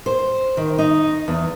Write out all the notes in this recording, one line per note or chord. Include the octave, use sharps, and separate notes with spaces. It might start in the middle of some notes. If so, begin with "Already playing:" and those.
C5
D#3
D#4
E2